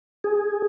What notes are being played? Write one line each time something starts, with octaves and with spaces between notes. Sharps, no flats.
G#4